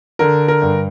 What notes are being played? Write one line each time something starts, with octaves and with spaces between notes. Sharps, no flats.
D3 A#4
A#4
G2